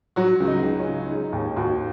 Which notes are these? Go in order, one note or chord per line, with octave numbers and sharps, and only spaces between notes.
F#3 F#4
C#2
D#4
C#2
C#4
C#3
G#3 D#4
D#2
D#2 F#4